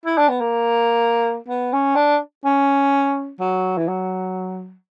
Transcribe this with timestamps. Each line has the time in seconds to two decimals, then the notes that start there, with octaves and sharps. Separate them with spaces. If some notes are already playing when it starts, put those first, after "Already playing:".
0.05 E4
0.17 D4
0.29 B3
0.40 A#3
1.48 B3
1.73 C#4
1.96 D4
2.45 C#4
3.39 F#3
3.77 E3
3.88 F#3